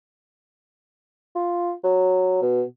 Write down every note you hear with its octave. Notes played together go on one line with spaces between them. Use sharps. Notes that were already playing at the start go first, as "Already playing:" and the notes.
F4
F#3
B2